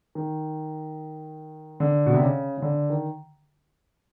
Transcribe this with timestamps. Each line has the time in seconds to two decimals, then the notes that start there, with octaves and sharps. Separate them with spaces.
0.15 D#3
1.80 D3
2.06 B2
2.14 C3
2.22 C#3
2.58 C#3
2.62 D3
2.90 D#3